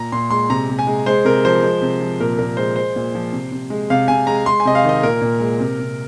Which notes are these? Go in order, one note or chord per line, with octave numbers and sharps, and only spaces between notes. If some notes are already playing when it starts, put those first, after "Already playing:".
Already playing: A#2 A#5
A#2 C6
G#3 C6
C3 A#5
C3
G#5
G#3
G#3 C5
C3 A#4
F3 C5
G#3
C3
F3
A#2 A#4
A#2 A#4
G#3 C5
G#3 C5
A#2
F3
C3
C3
G#3
C3 F5
C3 G#5
G#3 A#5
G#3 C6
G#5
C3 D#5
F5
D#3 D#5
A#2 A#4
A#2
G#3
C3
C3